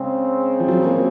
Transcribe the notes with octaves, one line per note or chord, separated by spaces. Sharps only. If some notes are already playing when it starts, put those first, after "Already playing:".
Already playing: C#3 G#3 C4
F3
F#3
A#3